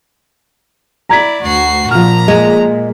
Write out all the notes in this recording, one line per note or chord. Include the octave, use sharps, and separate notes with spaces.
E4 D5 A#5 G#6 B6
D2 F#4 C7
A#2 F3 A#5 F6
G#3